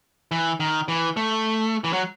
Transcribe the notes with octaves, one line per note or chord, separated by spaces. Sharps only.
E3
D#3
E3
A3
E3
F#3